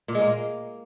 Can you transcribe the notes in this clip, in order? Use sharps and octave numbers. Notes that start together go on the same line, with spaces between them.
A#2
G#3
A#3